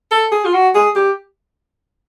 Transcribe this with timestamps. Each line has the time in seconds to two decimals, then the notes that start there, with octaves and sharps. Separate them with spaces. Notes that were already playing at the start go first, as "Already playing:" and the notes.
0.11 A4
0.32 G#4
0.45 F4
0.54 F#4
0.75 G#4
0.96 G4